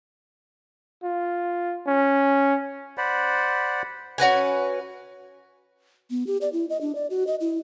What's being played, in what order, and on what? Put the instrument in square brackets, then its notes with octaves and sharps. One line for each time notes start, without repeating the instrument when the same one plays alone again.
[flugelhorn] F4
C#4
[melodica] C5 D5 F#5 B5
[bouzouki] C#4 F#4 B4 G#5
[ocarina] B3
G4
D5
E4
D#5
D4
D5
F#4
D#5
E4